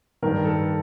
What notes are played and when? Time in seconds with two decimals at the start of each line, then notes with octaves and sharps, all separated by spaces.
0.22 G2 D#3 A#4
0.45 A4